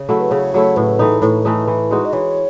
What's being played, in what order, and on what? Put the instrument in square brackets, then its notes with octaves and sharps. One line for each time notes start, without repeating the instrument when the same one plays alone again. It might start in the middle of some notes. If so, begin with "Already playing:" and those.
Already playing: [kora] C#3
[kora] F#3 A3 E4 [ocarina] A4
[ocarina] B4
[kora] C#3 [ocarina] C#5
[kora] F#3 A3 E4
[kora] A2 [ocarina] B4
[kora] E3 A3 D#4
[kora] A2 [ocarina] B4
[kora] E3 A3 D#4
E3
G#3 D#4 F#4
[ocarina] D#5
[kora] E3 [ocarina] C#5